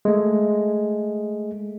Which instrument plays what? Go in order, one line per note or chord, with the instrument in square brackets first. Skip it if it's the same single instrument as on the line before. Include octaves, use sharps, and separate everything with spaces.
[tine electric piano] G#3 A3